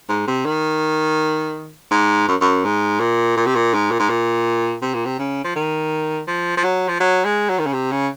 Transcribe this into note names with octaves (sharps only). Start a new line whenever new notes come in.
G#2
C3
D#3
G#2
F#2
F#2
G#2
A#2
A#2
C3
A#2
G#2
A#2
G#2
A#2
C3
A#2
C3
C#3
F3
D#3
F3
F3
F#3
F3
F#3
G#3
F#3
D#3
C#3
C3
C#3